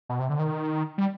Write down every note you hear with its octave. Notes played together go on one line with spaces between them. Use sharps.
B2
C3
D3
D#3
G3